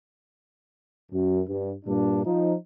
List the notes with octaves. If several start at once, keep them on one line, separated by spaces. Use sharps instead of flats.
F#2
G2
G2 A#2 D4
F3 D#4